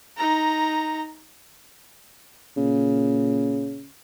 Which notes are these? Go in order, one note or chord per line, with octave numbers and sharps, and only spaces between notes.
D#4 A#5
A#2 C#3